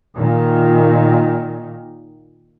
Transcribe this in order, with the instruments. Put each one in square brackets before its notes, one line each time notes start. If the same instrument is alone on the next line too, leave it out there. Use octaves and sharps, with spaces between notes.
[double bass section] A#2 D#3